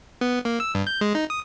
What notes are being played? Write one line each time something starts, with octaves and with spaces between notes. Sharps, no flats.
B3
A#3
E6
G2
G6
G#3
D#4
D#6